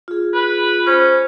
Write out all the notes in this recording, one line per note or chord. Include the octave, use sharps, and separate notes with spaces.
F4 G#4
B4
C#4 C5